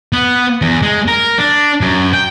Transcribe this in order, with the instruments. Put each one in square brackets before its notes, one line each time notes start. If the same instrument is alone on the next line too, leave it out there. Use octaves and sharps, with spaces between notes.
[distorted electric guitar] B3
E2
G#3
A#4
D4
F#2
G5